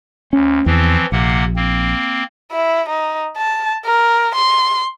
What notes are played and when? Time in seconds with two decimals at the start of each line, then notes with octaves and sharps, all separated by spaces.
0.33 D2 C#4
0.66 E2 E3 F3 C4
1.12 A#1 C3 A#3 F#5
1.56 A#3 C4
2.52 E4
2.89 D#4
3.37 A5
3.85 A#4
4.35 C6